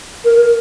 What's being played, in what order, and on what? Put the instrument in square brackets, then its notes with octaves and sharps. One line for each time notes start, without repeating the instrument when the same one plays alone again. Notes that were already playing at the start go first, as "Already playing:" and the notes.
[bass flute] A#4
A#4